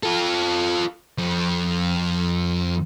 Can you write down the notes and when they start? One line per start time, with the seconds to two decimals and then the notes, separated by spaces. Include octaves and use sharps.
0.03 F4 A4
1.18 F2